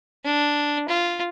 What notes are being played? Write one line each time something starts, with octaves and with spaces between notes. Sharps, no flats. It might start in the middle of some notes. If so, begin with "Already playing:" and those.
D4
F4